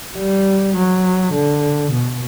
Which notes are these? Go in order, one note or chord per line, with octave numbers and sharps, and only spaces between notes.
G3
F#3
D3
B2